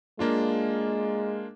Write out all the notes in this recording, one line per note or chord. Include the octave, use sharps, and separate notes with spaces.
G#3 A#3 D4 F4